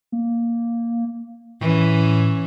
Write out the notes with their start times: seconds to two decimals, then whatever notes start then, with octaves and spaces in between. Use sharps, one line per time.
0.12 A#3
1.61 A2 E3 C#4